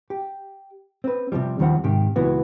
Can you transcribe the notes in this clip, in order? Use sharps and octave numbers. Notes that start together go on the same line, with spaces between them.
G4
C4 B4
C3 D#3 F3 G3
D#2 D#3 F3 G3 C4 F#5
G#2 C3 D#3 G4
C#2 A#2 E3 B3 F#4